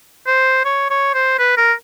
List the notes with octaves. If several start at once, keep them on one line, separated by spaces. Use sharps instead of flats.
C5
C#5
C#5
C5
B4
A#4